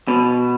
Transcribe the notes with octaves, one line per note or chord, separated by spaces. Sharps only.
B2